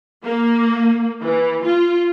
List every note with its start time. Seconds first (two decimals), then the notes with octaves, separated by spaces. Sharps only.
0.25 A#3
1.22 E3
1.63 F4